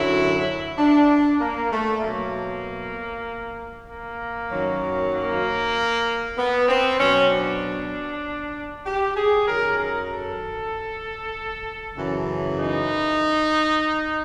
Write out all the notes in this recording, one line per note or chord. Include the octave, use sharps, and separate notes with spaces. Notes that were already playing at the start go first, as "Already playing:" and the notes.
Already playing: F#2 D3 F#3 E4
D4
A#3
A3
B2 F#3 A#3
A#3
F#2 D#3 F#3
A#3
B3
C4
B2 F#3 C#4
D4
G4
G#4
F#2 D#3 F#3 A#4
A#4
A4
F#2 C#3 E3
D#4